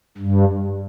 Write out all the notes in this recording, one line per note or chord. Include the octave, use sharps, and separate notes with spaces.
G2